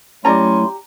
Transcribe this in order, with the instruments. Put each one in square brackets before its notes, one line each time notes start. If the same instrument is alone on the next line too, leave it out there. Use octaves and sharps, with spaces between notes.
[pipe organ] F#3 A3 E4 [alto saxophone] C#4 [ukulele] G4 D5 A#5 [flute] C6